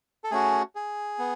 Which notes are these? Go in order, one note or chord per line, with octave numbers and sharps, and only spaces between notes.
A4
A3 C#4 F#4 G#4
G#4
B3